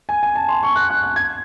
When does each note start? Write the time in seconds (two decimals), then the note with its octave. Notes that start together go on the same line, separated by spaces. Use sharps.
0.09 G#5
0.23 G#5
0.35 A5
0.49 C6
0.63 C#6
0.76 F#6
0.90 F#6
1.03 F#6
1.16 G#6